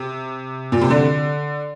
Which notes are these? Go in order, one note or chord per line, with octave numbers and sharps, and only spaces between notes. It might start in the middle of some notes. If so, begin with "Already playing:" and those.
Already playing: C3
A#2
C3
D3